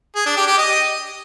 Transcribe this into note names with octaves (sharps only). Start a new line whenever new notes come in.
G#4
D4
G4
G4
D#5